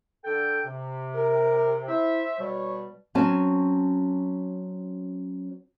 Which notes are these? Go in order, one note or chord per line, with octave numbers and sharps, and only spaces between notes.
D3 A4 G5
C3
A#4
E4 C5 E5
B2 G3 C#5
F#3 C4 C#4 G#5 A5